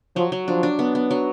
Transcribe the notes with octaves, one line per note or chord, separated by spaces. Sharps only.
F3 F#3
F#3
F3 D4
D4
B3
B3
F#3